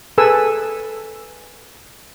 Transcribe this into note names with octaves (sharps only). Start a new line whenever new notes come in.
G#4 A4 B4 G#5 E6